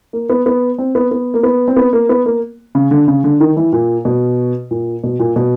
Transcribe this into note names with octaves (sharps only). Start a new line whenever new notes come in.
A#3
B3
B3
C4
B3
B3
A#3
B3
C4
B3
A#3
B3
A#3
C#3
D3
C#3
D3
D#3
E3
A#2
B2
A#2
B2
A#2
B2